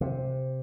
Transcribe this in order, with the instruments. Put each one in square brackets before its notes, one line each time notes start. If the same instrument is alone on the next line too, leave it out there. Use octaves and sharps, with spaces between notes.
[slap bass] C3